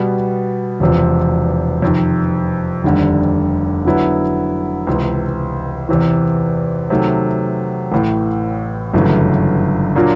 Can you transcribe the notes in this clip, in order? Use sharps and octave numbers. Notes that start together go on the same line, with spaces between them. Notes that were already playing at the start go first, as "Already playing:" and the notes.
Already playing: B2 G3 B3
E1 E2 C3 F3
F2 C3 D#3
F1 D#2 D3 G3
D3 F#3 B3 E4
C#2 C3 E3
E2 C3 E3
C3 D#3 F#3 A3
A1 A2 E3
G1 F#2 C#3 E3 A3
A#2 F#3 A#3 D4 F4